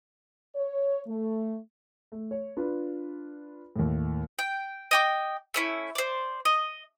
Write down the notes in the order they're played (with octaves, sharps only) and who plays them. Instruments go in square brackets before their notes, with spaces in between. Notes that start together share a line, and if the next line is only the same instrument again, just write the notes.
[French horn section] C#5
A3
[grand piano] A3
C#5
D4 F4 B4
D#2 A2
[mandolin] G5
D#5 G5 D6
A3 C#4 E4
C5 D5
D#5